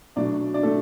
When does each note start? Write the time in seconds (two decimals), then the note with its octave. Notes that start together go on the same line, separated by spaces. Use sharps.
0.16 B2 F#3 A3 D4 D5
0.54 D4 D5
0.63 A3 A4